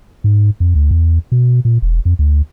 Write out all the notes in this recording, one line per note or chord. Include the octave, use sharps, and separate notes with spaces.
G#2
F2
D2
E2
B2
A#2
E1
F2
D2